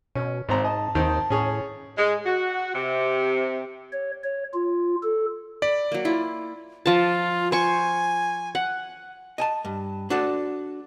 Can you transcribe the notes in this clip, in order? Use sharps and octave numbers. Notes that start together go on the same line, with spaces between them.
B2 C#4
G#1 G#2 C4 A#5
D#5 A5
D#2 D#3 C4 D#4
A2 C#4 G#4 C#5
G#3
F#4
C3
C#5
C#5
F4
A4
D5 B5
F#3 A#3
E4 F4
F3 F4 A5
C5 G#5 C#6
F#5
D#5 G#5 A5
G2
D4 F#4 A4 D5